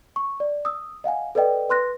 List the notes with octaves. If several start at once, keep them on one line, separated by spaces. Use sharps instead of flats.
C#6
D5
D#6 E6
D#5 F5 F#5 G#5
A4 B4 D5 D#5 G5
B4 C6 F#6 A#6